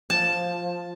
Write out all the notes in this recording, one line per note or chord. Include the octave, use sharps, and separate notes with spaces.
F3 A5